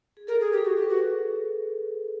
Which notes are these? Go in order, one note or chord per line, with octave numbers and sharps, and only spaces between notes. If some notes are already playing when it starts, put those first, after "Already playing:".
G#4
A4 A#4
G#4
G4
G#4
F#4 A4
G4
B4
F#4